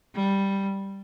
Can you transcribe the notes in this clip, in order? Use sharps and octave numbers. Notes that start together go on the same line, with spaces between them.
G3